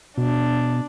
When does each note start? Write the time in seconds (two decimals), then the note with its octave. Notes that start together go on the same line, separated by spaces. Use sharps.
0.17 B2 D4